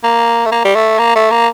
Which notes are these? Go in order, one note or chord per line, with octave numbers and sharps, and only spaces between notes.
A#3
A3
A#3
G3
A3
A#3
A3
A#3